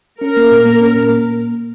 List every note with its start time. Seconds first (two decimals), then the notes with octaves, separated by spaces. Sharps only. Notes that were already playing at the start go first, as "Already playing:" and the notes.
0.21 C#4 A#4
0.37 A#3
0.51 A#2
0.65 A#3
0.81 C#4
0.95 A#2
1.09 A#3